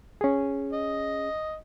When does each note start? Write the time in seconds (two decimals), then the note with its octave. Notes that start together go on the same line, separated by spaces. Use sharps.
0.21 C#4 G#4
0.73 D#5